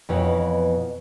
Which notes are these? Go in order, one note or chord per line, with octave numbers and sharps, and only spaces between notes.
F2 B2 E3 B3 E4 C#5